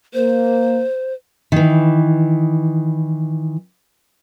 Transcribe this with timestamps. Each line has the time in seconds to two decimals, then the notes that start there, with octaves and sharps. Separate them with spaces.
0.14 A#3 C5
1.52 D#3 E3